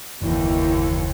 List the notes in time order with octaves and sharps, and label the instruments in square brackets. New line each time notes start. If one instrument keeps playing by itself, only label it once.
[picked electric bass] F#1 [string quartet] D#2 [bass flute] E3